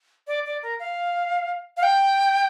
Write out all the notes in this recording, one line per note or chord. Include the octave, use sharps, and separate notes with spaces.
D5
D5
A#4
F5
F5
G5